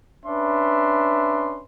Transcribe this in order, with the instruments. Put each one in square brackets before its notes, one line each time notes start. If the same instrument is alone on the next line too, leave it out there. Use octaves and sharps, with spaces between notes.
[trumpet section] C#4 D4 B4 E5 C6